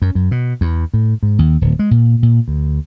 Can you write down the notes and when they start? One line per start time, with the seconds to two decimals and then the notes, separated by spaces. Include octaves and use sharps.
0.02 F#2
0.15 F#2
0.31 B2
0.61 E2
0.94 A2
1.23 G#2
1.39 D#2
1.61 D1
1.79 G#3
1.91 A#2
2.23 A#2
2.48 D2